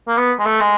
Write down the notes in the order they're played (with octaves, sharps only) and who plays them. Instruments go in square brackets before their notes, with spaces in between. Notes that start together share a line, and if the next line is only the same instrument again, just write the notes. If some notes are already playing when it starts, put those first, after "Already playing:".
[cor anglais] A#3
B3
G#3
A3
G#3